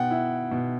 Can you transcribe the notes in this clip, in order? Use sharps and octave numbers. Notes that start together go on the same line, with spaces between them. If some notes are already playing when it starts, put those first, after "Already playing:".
Already playing: B2 F#5 G5
E4
B2